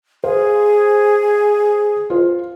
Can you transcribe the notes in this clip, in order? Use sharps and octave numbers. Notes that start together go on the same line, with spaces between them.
G#4 C5 F5
F4 C5